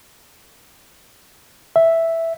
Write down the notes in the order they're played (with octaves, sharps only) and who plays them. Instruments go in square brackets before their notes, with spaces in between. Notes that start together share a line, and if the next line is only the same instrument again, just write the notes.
[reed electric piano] E5